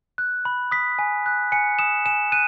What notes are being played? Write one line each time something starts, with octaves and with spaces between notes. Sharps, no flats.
F#6
B5
D#6 B6
G#5
F#6
G#5 C#7
D#6 E7
G#5 E7
F#6 D#7